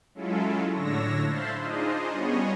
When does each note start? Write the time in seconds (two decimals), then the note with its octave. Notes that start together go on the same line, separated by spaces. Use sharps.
0.15 F#3 G#3 C#4 E4 F4 A4
0.72 A2 D3 D4 C#5 E6 A#6
1.25 C5 E5 F5 A5 B5 C6
1.57 D4 D#4 F4 G#4 C5 D#5
2.11 G3 B3 C#4 G#4 C#5 D#5